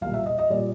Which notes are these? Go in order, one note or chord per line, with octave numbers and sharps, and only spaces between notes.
B1 A#2 G3 F5
E5
D#5
D#5
A#2 G3 D5